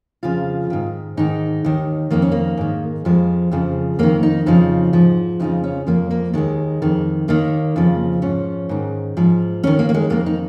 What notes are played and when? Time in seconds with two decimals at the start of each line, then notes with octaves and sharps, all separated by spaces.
0.23 F2 C#3 F3 F4
0.70 G#2 D#3
1.17 G#2 D#3 D#4
1.64 D#2 D#3
2.11 F2 D#3 A#3
2.22 C#4
2.32 A#3
2.57 G#2 D#3
3.05 F2 F3 G#3
3.51 F2 C#3 F3
3.99 F2 D#3 A#3
4.23 D#4
4.46 F2 C#3 F3 D#4
4.93 G#2 F3
5.40 F2 C#3 F3 D#4
5.64 C#4
5.87 F2 F3 A#3
6.11 A#3
6.34 D#2 D#3 G#3
6.82 F2 D#3
7.28 D#2 D#3 A#3
7.76 F2 C#3 F3
8.22 G#2 F3 C#4
8.69 G#2 D#3
9.17 G#2 F3
9.63 D#2 D#3 C#4
9.79 A#3
9.89 A#3
9.94 G#3
10.10 F2 D#3 A#3
10.26 D#4